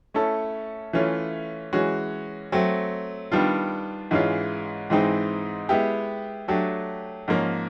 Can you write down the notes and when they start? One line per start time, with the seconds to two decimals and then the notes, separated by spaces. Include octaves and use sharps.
0.14 A3 C#4 E4 A4
0.93 E3 A3 C#4 F4
1.73 E3 G#3 C#4 F#4
2.52 F#3 A3 C4
3.32 D#3 G3 B3 D4 F4
4.11 G#2 E3 G#3 C#4 F4
4.90 G#2 E3 G#3 C4 D#4
5.69 G#3 B3 E4 G4
6.48 F#3 A3 D4 G4
7.28 G#2 F3 A#3 C#4